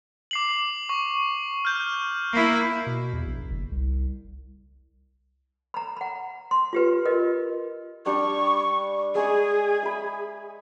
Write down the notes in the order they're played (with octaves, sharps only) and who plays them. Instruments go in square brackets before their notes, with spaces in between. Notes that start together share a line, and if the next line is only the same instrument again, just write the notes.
[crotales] D6 C7 F#7
C#6
F6 G6
[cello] A#3 E4
[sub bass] B2
E2
A#1
F#1
C2
[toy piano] A#5 B5
F#5 B5
C6
F4 G4 B4
F4 A#4 B4 D#5
[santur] G3 D4 G5 [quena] C#6
[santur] G#3 G#5 C#6 [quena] G#4
[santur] E5 B5